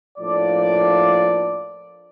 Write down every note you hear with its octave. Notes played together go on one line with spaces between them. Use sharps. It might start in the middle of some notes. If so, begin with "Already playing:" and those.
A2 F3 A#3 D4 D5